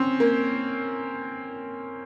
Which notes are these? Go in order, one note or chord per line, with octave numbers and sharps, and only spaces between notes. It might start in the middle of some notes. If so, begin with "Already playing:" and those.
Already playing: C4 C#4
A#3